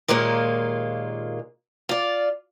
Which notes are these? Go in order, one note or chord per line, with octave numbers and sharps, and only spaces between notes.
D#2 A#2 G#3 A#3 F4
F4 D5